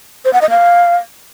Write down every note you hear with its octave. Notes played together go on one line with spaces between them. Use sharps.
C5
F#5
D#5
F5